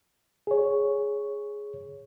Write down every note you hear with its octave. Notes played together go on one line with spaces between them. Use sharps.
G#4 C#5